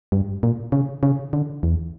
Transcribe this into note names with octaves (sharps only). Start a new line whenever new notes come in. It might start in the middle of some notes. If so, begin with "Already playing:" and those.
G2
A#2
C#3
C#3
D3
E2